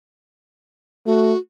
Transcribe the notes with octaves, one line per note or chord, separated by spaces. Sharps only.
A3 F#4